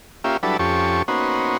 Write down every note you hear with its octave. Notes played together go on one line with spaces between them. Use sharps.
A#3 C#4 F4 G4 E5
F#3 G3 D4 E4 A4 B4
F2 C#4 G4 A4 C#6
A#3 B3 C#4 D#4 F#4 C5